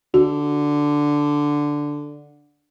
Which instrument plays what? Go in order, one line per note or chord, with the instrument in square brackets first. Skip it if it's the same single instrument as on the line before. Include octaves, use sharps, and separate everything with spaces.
[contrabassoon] D3 [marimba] F#4